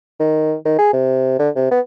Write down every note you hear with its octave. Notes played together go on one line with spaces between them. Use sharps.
D#3
D#3
G#4
C3
D3
C3
B3